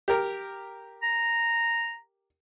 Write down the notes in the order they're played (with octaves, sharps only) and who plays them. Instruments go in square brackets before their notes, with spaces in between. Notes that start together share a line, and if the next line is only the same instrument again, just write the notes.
[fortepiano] G4 A#4
[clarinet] A#5